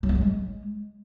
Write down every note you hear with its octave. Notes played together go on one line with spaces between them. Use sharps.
F#3
B3
F#3
G#3